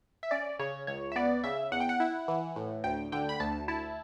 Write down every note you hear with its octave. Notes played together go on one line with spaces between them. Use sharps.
E5
C#4 D5
C#3 C#5
C#2 C#5
E5
B3 D5
C#3 E5
E2 F#5
G5
F#5
E4
E3
A2
D2 G5
D3 G5
B5
D2 A5
E4 A5